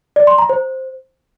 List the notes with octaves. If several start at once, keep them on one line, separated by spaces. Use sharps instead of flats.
D5
C6
A#5
C5